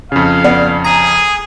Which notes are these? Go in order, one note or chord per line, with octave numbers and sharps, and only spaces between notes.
F2 C#3 F5
B3 D5
G#4 A#5